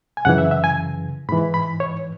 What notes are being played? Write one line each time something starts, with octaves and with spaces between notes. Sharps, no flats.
G#5
F#2 C#3 E3 F#5
E5
E5
G#5
G#2 E3 B5
B5
C#5